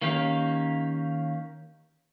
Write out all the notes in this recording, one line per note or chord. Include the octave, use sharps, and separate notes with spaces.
D#3 A#3 C#4 G4 F5